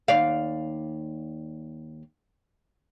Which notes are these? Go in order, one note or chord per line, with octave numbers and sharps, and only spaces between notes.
D#2 D5 F5